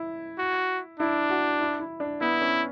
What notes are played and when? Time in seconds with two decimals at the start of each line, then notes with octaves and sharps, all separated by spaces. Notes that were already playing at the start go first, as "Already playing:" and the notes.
Already playing: E4
0.39 F#4
0.99 D4 E4
1.30 F#4
1.60 E4
1.80 E4
2.00 D4
2.21 B3 E4
2.41 C#4